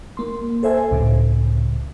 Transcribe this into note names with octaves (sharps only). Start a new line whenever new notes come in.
A#3 C6
A4 C5 E5 G#5
C#2 A2 C#3